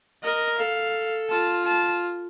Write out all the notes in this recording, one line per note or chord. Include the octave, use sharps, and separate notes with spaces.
A#4 D#5
A4 F5
F4 A5
A5